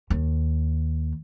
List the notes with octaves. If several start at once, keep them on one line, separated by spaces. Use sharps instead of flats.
D#2